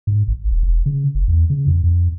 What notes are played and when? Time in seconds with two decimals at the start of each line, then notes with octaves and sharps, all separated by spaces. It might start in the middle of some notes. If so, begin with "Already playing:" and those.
0.07 G#2
0.28 G#1
0.51 D#1
0.63 E1
0.86 C#3
1.15 F#1
1.28 E2
1.50 C#3
1.67 F2
1.84 F2